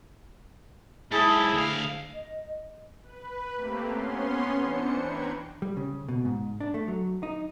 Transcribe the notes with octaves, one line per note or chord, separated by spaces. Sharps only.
G#2 E4 G#4 A4
D2 F5
D#5
B4
A3 A#3 C4 G4
B3 C#4 C6
E3 D4 C5 C#7
B4 G5 A#5 G#6
G3
C#3
B2
G#2
D4
A3
F#3
D#4